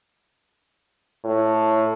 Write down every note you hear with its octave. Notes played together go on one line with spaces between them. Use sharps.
A2